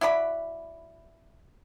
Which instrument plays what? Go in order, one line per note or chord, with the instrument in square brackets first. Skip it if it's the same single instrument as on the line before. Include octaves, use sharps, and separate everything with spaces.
[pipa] E4 F#4 D5 B5